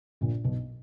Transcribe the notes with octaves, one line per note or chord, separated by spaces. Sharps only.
A#1 A#2
B1 B2